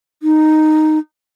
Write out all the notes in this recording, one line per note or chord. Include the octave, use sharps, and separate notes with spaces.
D#4